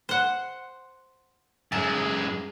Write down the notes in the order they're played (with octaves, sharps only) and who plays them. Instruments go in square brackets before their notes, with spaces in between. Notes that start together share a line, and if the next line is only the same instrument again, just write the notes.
[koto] C5 F#5
[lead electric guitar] F#2 G#3 [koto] A5